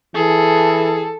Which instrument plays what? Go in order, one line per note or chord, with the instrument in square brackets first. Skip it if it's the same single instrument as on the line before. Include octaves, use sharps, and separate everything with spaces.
[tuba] E3 [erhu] G#4 [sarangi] A4